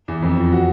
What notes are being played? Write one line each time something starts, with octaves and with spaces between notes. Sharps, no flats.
E2
F2
F3
F#4